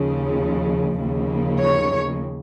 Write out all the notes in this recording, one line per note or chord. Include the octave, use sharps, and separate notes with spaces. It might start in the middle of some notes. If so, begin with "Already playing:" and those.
Already playing: D#2 C#3 F3
D#2 C#3 F3 A#3
C#5